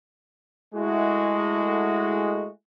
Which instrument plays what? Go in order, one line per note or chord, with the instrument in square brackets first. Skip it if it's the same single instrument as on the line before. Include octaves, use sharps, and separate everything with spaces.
[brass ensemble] G#3 A3 E4 F#4